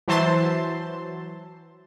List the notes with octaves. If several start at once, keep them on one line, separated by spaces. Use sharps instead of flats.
E3 F#3 C5 E5 A5 C6